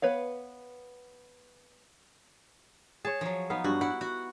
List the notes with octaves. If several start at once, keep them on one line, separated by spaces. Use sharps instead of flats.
B3 B4 C#5 F5
G#4 C#5 A5
F3 F#3
B3 D#4 F5
G2 F#4
E4 F#5
F#4